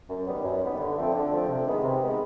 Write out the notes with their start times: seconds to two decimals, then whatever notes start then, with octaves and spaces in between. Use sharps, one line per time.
0.09 F#2
0.26 D#3 G3 B3
0.43 F#2
0.62 D#3 G3 B3
0.78 D3
0.97 F3 A3 C4
1.13 D3
1.31 F3 A3 C4
1.48 C3
1.65 D#3 G#3 B3
1.83 C3
2.01 D#3 G#3 B3